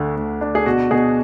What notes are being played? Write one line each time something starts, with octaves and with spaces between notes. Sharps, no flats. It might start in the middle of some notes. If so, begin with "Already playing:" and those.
Already playing: D2 D3 A3 D4
D2
D4
G#4
B2 F#4
B2 G#4